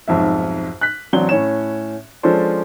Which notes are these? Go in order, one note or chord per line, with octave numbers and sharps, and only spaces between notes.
B1 F2 G#2 E5
F#6 B6
A1 F#3 C4 D4 G7
A2 C#4 C#5 E7
F3 G#3 C#4 D4 A4 C5